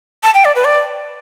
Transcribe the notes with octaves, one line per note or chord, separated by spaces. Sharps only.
A5
G5
D5
B4
D5